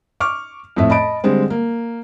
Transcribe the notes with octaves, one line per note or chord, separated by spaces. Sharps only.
C#6 D6 F6
F2 A2 A3 E5
D#5 A5 B5 D7
D3 G3 G#3 C4
A#3